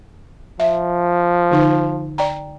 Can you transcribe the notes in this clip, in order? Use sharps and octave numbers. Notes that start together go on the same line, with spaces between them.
F3 E5
D3 D#4
D5 G5 A#5